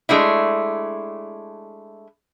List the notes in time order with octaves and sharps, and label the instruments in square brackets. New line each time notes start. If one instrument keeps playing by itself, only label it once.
[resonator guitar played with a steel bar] G#3 A3 D4 E4